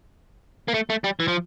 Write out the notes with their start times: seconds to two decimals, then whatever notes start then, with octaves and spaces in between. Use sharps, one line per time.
0.68 A#3
0.74 A3
0.90 A3
1.04 G3
1.20 E3
1.28 F3